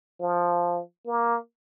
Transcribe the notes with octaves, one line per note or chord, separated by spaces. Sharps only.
F3
A#3